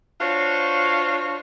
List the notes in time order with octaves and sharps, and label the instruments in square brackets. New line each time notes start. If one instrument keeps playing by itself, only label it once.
[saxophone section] D4 F4 F#4 C5 C#5